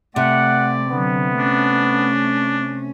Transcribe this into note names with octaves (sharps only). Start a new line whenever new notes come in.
C3 A3 D5 F#5
D3 F#3 B3
A3 C#4 D4